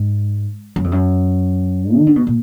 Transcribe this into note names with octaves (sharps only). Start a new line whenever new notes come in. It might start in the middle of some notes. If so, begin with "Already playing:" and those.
Already playing: G#2
F#2
F2
F#2
D#3
D3
B2
A#2